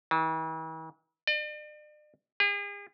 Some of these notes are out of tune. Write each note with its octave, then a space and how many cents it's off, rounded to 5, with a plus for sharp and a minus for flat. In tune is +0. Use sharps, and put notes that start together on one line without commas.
E3 -45
D5 +40
G#4 -40